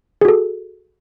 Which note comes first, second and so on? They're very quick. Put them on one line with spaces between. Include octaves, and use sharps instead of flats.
G#4 F#4 A4